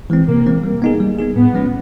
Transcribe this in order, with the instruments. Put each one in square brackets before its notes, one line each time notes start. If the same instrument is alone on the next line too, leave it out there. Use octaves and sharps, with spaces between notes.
[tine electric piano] E3 G#3 C4
[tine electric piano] C3 [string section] A#3
[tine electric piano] E3 G#3 C4
[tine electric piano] G3 [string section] A#3
[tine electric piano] B3 D#4 G#4
G3
B3 D#4 G#4
[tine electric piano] A2 [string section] B3
[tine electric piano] F3 G#3 C#4 F4